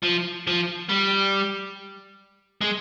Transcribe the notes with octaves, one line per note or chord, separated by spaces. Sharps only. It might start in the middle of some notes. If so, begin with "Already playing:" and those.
F3
F3
G3
G#3